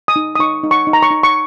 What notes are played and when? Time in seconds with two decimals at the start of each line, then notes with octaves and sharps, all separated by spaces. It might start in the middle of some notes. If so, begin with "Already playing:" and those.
0.08 D#6
0.16 D#4
0.35 D#6
0.39 D#4 C#6
0.64 D#4
0.71 C#6
0.87 D#4
0.93 A#5
1.03 C#6
1.11 D#4
1.23 C#6